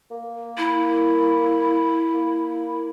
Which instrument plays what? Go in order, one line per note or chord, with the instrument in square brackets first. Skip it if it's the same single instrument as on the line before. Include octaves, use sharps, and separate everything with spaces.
[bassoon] A#3
[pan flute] E4
[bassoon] A#3